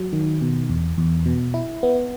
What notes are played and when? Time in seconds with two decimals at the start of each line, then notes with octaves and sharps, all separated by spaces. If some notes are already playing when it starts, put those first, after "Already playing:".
Already playing: F#3
0.13 D#3
0.41 B2
0.70 E2
0.98 E2
1.26 B2
1.54 E4
1.83 B3